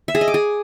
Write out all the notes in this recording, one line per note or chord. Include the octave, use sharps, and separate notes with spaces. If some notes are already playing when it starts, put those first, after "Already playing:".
E5
G#4
D#5
D6
G#4